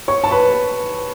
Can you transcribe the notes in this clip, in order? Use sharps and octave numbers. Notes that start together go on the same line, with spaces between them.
C#5 C#6
A5
B4 B5